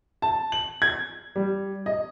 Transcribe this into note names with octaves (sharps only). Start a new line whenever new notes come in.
A5
F#7
G#6
G3
D#5